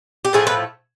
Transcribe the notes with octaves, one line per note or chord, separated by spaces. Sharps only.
G4
A2 F3 A3 G#4
B4